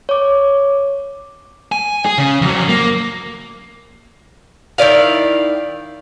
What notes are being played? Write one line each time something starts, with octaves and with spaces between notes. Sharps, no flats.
C#5 D6
G#5
G#4
C#3
F2 F#3
A#3
D#3 E4 D5 F5